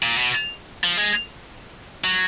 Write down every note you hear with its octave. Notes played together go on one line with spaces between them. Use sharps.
A#2
B2
F3
G#3
F#3